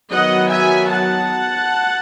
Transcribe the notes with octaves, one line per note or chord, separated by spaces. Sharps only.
D#3 F#3 B3 D#5 F#5
E5 G#5
F#5 A5